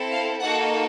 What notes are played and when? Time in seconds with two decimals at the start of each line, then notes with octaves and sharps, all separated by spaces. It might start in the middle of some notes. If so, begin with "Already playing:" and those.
Already playing: C4 E4 A4
0.11 F5
0.41 A#3 D#4 F#4 A4 F#5